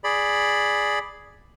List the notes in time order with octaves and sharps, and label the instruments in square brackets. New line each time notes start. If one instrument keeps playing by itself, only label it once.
[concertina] G#4 D5 B5